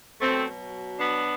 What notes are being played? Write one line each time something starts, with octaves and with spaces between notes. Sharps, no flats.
B2 F#3 A3 C4
B3 D4